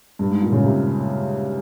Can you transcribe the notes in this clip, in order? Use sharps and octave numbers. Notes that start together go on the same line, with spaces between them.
G2
G#2
A#2
C#3
C3